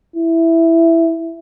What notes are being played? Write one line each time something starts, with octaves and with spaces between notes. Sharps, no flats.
E4